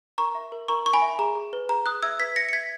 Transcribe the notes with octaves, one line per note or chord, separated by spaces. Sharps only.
A#4 A#5 C#6
E5
A#4
A#4 A#5 C#6
A#4 C#6
G#5 B5
E5
G#4 A#5
G#4
B4
G#4 A#5
G#4 D#6 F#6
E5 E6 G#6
B4 G#6 B6
E5 A#6 C#7
C#7
E5 G#6 B6